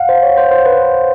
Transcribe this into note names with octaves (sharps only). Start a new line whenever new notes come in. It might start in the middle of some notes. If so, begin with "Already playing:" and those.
Already playing: F5 F#5
C5
C#5
C5
C5
B4